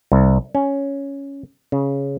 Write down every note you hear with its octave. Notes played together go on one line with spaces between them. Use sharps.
C2
C#4
C#3